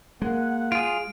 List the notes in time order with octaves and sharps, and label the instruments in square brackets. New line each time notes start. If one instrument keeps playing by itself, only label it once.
[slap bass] G#3 [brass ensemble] A#3 F#5
[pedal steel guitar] F4 G#4 [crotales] D7